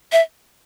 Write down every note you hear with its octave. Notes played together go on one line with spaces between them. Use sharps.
E5